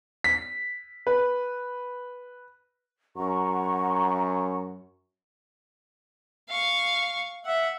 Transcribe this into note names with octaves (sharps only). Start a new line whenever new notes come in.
B6
B4
F#2 F#5 A#5 C#6
F5 C#6
E5 F#5